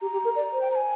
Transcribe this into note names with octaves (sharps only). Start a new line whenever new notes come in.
G4 A#5
G4
A#4
D5
C5
G5
A#5
G#5